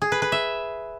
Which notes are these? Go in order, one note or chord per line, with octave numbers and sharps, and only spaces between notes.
G#4
B4
B4
E5